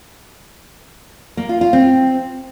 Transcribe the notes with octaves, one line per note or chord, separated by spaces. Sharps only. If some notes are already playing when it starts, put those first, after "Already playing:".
A#3
F4
F4
C4